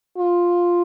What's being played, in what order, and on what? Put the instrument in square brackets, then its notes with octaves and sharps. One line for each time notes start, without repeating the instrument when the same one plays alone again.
[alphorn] F4